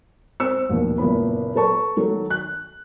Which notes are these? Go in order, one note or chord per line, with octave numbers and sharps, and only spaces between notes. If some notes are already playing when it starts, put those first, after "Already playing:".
C4 E6 C#7
A#1 D#2 B2
F#1 A#2 B3 B5
A4 B4 A5 C#6
D#3 F#3 A4
F#6